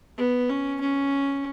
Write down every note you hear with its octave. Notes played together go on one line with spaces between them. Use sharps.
B3
C#4
C#4